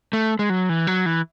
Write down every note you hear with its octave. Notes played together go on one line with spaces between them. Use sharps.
A3
G#3
F#3
E3
F#3
E3